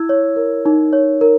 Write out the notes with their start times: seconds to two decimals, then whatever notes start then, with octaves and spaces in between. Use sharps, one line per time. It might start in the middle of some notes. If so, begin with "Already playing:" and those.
Already playing: E4 E6 G#6
0.09 C#5
0.36 A#4
0.66 D#4
0.93 C#5
1.21 A#4